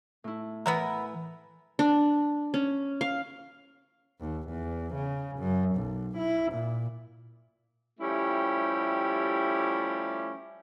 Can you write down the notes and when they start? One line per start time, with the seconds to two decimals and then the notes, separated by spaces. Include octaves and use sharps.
0.24 A2 E4
0.66 E3 B3 E4 A#4
1.79 D4
2.54 C#4
3.01 F5
4.21 D#2
4.49 E2
4.95 C#3
5.39 F#2
5.76 B1
6.18 E4
6.52 A#2
8.00 F3 G3 A3 C#4 E4 G4